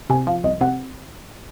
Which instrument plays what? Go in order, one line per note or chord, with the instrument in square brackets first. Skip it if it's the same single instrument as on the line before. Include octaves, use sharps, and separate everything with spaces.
[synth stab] C3 [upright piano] G#5
[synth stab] F3 [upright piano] F5
[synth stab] C2 [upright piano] D#5
[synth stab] C3 [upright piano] F#5